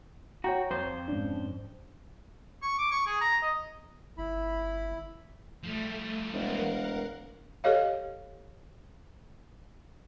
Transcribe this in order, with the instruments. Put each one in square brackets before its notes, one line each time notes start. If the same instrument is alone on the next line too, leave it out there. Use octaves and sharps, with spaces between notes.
[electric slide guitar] F#4 [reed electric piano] C#5 G5 A#5
[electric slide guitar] F2 C5
[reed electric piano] G#2 C#4 D4
[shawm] C#6
D6
C#6
G#4
A#5
D#5
[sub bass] G1 [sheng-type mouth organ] E4 B5
[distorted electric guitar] F3 G3 [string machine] A3
[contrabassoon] E1 [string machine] A#4 F5 F#5
[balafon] G4 A4 C#5 D#5 F5